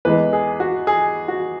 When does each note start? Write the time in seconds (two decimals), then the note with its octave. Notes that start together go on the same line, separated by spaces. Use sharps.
0.05 E2 E3 G#3 B4
0.33 G#4
0.60 F#4
0.87 G#4
1.28 F#4